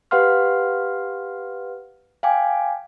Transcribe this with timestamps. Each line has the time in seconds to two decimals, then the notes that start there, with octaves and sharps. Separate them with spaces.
0.11 G4 B4 F5 F#5 C6 F6
2.23 F5 G5 G#5 D6